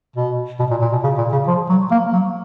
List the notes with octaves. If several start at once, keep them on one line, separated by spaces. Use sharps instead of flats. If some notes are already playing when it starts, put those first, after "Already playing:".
B2
B2
A#2
A#2
B2
C#3
A#2
C#3
F3
F#3
A#3
F#3